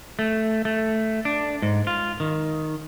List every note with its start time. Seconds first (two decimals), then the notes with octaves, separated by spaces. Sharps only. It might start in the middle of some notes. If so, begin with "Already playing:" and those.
0.19 A3
0.65 A3
1.25 D4
1.62 G#2
1.87 F4
2.20 D#3